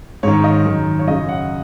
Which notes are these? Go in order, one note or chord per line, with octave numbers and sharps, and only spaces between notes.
G#2 D#3 C#5
D#5
F#2 D#3
C#5
F#2 C#3 D#5
F#5